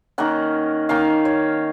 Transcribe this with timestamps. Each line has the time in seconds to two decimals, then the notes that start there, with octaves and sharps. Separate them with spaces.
0.18 D#3 A#3 C#4 F#5
0.89 D#3 A#3 C#4 F5
1.25 C#5